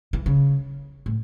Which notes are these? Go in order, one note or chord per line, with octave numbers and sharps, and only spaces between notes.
E3
C#3
A2